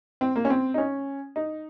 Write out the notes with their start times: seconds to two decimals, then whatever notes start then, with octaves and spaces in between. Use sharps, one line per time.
0.21 C4
0.36 A#3
0.45 C#4
0.50 C4
0.74 D#4
0.78 C#4
1.36 D#4